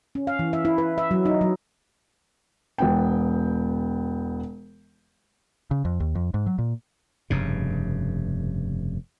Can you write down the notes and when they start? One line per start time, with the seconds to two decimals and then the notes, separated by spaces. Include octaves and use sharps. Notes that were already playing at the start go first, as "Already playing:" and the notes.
0.15 C#4
0.27 F5
0.39 E3
0.53 E5
0.65 E4
0.78 B4
0.98 E5
1.11 F#3
1.26 D#4
1.41 F#3
2.78 E1 B3 G5
5.71 C#3
5.85 F2
6.00 D#2
6.15 F2
6.34 G#2
6.47 F#3
6.59 A#2
7.30 F1 G2 C#3